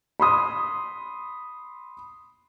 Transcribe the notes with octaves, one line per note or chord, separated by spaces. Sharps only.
B5 C6 D#6